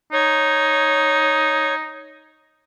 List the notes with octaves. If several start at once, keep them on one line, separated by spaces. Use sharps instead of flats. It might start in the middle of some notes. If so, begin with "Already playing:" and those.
D#4 C#5